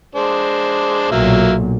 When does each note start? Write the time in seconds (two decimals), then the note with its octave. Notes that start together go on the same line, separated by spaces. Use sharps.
0.15 G#3 D4 C5
1.11 B1 A#2 F#3 A#3 E5